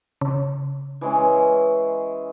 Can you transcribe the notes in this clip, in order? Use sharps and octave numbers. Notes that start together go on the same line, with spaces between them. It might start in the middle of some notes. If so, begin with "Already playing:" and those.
C#3
E3 G#3 C#4